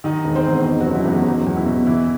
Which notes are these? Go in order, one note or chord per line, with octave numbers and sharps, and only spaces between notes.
D#3 D#4 D#5
E1
C4 C5
E2
B2
F#3 F#4
F#1
E4
E2
D#4
F#3
E2
E4
B2
E3 E4